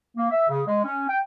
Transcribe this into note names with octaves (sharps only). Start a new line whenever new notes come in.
A#3
E5
C#3
G#3
C#4
G5